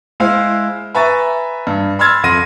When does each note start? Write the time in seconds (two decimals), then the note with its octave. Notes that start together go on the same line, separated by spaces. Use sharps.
0.20 G#3 E4 C5 F5
0.95 B4 E5 G#5 A#5 C#6 A6
1.67 G2
1.99 B5 C6 E6 F6 G#6 A6
2.24 F2 C6 A#6 D#7